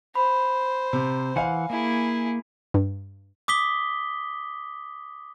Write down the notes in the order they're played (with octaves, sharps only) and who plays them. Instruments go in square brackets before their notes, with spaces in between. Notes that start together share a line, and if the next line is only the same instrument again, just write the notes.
[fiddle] C5 [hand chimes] B5
[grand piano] C3
[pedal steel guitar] E3 F#5 [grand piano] F5 G#5
[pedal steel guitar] A#3 [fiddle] E4 G#4
[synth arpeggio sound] G2
[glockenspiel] D6 D#6 B6 G7